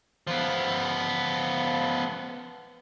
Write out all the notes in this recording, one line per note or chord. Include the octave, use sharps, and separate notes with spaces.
F3 B3